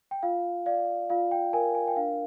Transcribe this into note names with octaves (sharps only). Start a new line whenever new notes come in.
G5
F4 F5
D5 F5
F4 F5
G5
A#4 G#5
G#5
G5
D4 F5